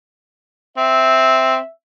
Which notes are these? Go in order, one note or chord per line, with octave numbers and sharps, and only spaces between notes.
C4 E5